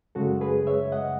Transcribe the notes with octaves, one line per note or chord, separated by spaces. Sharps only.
F#2 C#3 G#3 F#4 A4
G#4 B4
C#5 E5
D#5 F#5